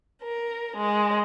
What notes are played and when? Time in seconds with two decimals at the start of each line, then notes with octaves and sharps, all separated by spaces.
0.22 A#4
0.77 G#3